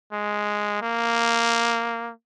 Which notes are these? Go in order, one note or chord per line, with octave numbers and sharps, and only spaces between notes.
G#3
A#3